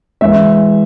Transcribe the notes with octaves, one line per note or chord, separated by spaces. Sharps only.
E3 G#3 E5